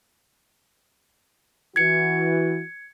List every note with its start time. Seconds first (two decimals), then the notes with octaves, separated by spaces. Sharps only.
1.76 E3 F#4 G#6 C#7